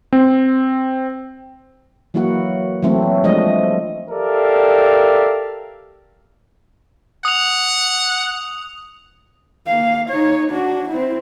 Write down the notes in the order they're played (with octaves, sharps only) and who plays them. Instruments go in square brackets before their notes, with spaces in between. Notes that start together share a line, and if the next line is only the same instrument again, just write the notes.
[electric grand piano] C4
[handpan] E3 F#3 A#3 E4 F#4 F#5
E3 F#3 A3 C4 E4
F3 G#3 A3 D4 D#5
[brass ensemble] G4 A4 A#4 D5 E5 F5
[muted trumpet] F#5 [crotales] D#6 F7
[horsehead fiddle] A#3 F5
D#4 C#5
D4 F#4
C4 E4